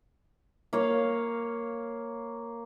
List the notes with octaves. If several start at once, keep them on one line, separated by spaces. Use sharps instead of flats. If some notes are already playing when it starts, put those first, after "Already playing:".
A#3 C#5 F5